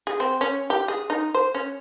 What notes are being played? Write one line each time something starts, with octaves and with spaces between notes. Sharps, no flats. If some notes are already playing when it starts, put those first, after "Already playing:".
G#4
C4
C#4
G4
G#4
D#4
C5
C#4